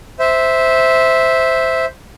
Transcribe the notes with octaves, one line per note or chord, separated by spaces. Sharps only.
C5 E5